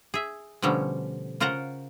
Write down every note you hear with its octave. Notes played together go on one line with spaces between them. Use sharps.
G#4 E5
B2 D3 F3 G3 A3 C#4
C#3 F4 A#4 C5 F#5 A#5